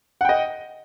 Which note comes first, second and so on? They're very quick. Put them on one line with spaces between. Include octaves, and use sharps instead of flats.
F#5 G5 D#5